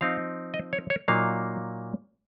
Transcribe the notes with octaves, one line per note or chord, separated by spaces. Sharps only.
F3 C4 D#4 F5
D#5
C#5
C#5
A#2 F#3 A#3 D#4 F5